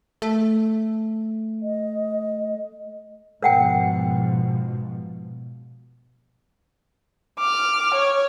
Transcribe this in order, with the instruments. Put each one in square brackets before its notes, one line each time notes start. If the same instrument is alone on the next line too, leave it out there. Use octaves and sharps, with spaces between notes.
[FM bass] A3
[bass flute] D#5
[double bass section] G#2 B2 F3 [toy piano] A#4 F#5 G5
[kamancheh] D6 F6
C#5